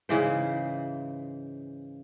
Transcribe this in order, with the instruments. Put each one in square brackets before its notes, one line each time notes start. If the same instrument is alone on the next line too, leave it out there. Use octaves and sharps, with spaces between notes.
[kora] G#2 C#3 E3 C5